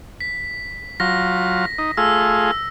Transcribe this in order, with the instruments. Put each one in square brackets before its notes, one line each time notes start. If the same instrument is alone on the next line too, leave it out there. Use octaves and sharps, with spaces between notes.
[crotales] B6
[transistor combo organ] F#3 F4 [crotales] A#6
[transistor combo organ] D#4
[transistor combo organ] A3 F4 G#4 [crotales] E6